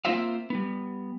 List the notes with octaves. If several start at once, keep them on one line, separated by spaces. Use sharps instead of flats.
A#3 C4 F4 C5 E5 F5
G3 B3